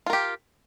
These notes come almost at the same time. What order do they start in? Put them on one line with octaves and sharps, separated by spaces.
F4 A#4 G4